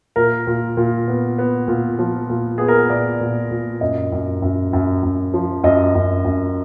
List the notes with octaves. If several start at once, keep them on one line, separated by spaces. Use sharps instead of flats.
A#2 A#4
A#2
A#2
B3
B3
A#2
F3
A#2
B3 G#4
A#4
B4
A#2 D5
A#2
A#2
F#2 D#5
F#2
F#2
F#2
F#2
F3
F#2 D#5
F#2
F#2